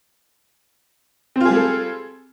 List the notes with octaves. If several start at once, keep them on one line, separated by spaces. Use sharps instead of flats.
G3 C4 F4 G#4 A4